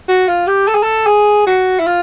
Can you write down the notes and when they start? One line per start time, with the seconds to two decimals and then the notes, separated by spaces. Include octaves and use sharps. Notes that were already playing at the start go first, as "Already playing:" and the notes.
0.08 F#4
0.28 F4
0.47 G4
0.68 A4
0.75 G#4
0.83 A4
1.07 G#4
1.47 F#4
1.79 E4
1.87 F4